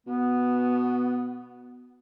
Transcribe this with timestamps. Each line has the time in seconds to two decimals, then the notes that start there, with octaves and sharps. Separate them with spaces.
0.07 B2 B3